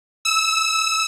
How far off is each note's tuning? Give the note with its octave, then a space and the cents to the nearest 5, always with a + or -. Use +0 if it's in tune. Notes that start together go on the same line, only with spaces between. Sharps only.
E6 -20